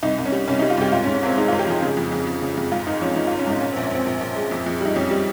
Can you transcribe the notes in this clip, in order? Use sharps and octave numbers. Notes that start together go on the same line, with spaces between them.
C2 D#4
C2
C#4
G3
C2 C#4
D#4
G3
F4
C2 G4
G#2 F4
C#4
G#2
C#4
G#1 C4
G#3 D#4
F4
G#1
G4
F3 G#4
C#3
F2
F2
F2
C#3
F2
G#2 F4
G#1 D#4
F3 C#4
F3 D#4
F4
G#1
C#4
G#2 D#4
A#2 C#4
C4
A#1
C#4
A#1 C4
A#1
A#1
G#3
F2
F2
G3 D#4
F2 C#4
G3